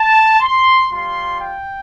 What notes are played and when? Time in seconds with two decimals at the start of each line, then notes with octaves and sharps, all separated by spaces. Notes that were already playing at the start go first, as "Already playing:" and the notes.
Already playing: A5
0.40 C6
0.89 G3 F4 C6
1.38 G5